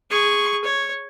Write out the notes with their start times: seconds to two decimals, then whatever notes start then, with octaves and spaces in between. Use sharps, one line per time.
0.10 G#4 C#6
0.64 C#5